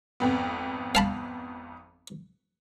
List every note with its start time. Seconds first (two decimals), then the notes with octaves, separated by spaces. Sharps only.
0.20 G#1 F2 B3
0.95 F5 A5 B5